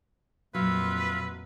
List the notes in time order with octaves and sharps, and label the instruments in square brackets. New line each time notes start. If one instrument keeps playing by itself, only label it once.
[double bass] F2 A#2 [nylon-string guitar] F#3 [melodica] F4 E5 F5 [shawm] B4